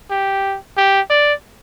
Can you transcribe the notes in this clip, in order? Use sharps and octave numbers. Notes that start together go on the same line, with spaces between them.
G4
G4
D5